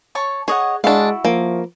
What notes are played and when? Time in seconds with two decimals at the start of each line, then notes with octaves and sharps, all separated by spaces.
0.15 C#5 A5 C#6
0.48 G#4 C#5 D#5 F#5
0.84 G#3 D4 E4 F#4 F5
1.25 F3 A#3